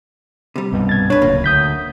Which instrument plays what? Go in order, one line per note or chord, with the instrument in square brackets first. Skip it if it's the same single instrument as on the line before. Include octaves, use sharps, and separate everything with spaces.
[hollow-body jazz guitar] C3 G3
[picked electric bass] C2 G2 B2
[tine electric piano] G#6 A6
[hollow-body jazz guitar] D4 B4 [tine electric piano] C#5
[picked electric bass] D1 C#2 [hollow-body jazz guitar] A#3
[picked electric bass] D2 [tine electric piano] D#6 G6 B6